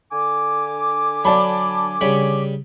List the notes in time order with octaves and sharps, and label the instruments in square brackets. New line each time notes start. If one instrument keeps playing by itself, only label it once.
[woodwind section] D3 G#5 D6
[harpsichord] F#3 [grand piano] D5 A5 B5
[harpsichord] C#3 G3 B5 [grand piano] C#5